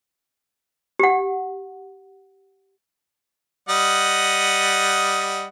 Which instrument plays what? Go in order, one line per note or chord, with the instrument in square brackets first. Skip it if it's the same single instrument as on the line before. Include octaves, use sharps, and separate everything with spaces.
[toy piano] G4 F#5
[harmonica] G3 D#5 F#5